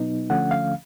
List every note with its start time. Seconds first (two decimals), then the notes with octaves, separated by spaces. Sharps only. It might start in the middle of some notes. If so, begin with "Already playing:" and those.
Already playing: B2 F#3 B3 D#4
0.30 D2 D3 F3 A3 C#4 F#5
0.51 F5